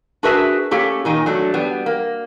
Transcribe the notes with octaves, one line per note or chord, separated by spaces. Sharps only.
D4 F#4 G#4 A#4 B4 E5
A3 A#3 C#4 G4 A4
A#2 D#3 D#4
F#3 A3 D4
G3 B3
A#3